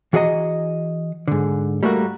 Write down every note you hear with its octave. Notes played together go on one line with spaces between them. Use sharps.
E3 F#4 G#4 A#4 D#5 A#5
G#2 D3
G3 A3 A#3 F#4 A#4